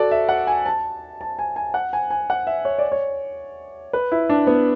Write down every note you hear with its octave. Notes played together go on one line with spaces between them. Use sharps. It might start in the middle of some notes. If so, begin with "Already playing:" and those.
Already playing: F#4 A4 D5
E5
F#5
G#5
A5
A5
G#5
G#5
F#5
G#5
G#5
F#5
E5
C#5
D5
C#5
B4
E4
D4
B3